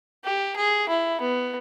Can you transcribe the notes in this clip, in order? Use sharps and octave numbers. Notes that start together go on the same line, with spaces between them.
G4
G#4
E4
B3